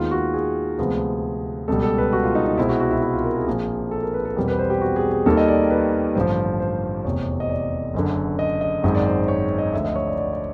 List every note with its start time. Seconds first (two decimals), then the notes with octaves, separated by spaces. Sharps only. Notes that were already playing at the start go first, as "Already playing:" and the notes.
Already playing: D#2 D#3 G#3 B3 F4
0.11 F#4
0.34 G#4
0.79 D2 C3 F3 G#3 B3
1.68 C#2 B2 G3 A4
1.83 A4
1.98 B4
2.13 F#4
2.24 F4
2.35 D#4
2.46 D#4
2.57 C2 B2 G#3 C4 E4
2.69 F#4
2.80 F#4
2.91 E4
3.02 E4
3.13 F4
3.24 A#4
3.36 G#4
3.47 A#1 A#2 F3 A#3
3.91 A4
4.03 A#4
4.14 B4
4.25 A4
4.36 E2 B2 G3 C4 A#4
4.48 B4
4.59 C5
4.70 G4
4.81 F#4
4.96 G#4
5.11 G#4
5.26 D#2 D#3 G3 A#3 A4
5.37 D#5
5.48 D5
5.70 B4
6.15 A1 G2 D3 F3 C5
6.60 C5
7.05 F1 E2 C3 C#5
7.40 D#5
7.49 D5
7.94 F#1 F#2 D3
8.39 D#5
8.61 D#5
8.83 G#1 F#2 D#3 G#3 D#5
8.95 D5
9.06 C5
9.28 C#5
9.58 D#5
9.73 D2 D3 F3 E5
9.84 D#5
9.96 C#5
10.07 D5
10.18 D5
10.33 D5